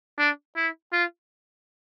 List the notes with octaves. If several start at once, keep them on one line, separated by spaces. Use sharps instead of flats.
D4
E4
F4